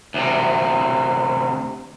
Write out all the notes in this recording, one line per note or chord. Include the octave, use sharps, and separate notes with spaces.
D2 C3